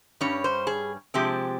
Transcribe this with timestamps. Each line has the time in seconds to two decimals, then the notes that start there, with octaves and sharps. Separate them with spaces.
0.21 G2 G3 C#4 C#5
0.44 C5
0.67 G#4
1.14 C3 F3 G#3 C4 G4